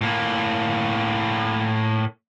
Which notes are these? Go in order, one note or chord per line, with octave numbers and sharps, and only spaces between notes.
A2 A#3